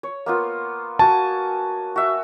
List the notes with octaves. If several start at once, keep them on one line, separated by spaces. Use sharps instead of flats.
C#5
A#3 B3 F4
F#4 G#5 A5
F#4 E5